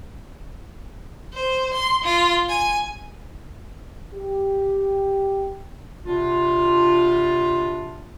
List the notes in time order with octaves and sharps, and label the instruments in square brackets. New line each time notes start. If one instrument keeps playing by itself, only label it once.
[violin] C5
C6
F4
G#5
[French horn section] G4
[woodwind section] C3 B3 D4 F4